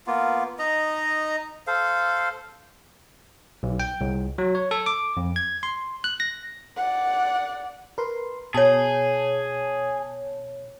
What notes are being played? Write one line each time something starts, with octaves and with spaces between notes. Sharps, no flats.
A#3 B3 F4
D#4 D#5 A#5
A4 C5 F5
B1
G5
C2
F#3
C#5
A4
D6
F2
G#6
C6
F#6
A#6
D5 F#5
A#4 B4 C6
B2 G#4 C#5 A5